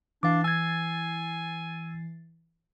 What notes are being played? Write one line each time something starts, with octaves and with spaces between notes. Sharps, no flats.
E3 D4 F5 D6 A6 C7
G#5 E6 G#6